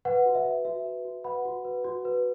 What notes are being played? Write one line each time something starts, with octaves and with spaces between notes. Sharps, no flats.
B4 F#5
F#4
E5
B4
F#4 E5
B4
F#4
B4 F#5 B5
F#4
B4
F#4
B4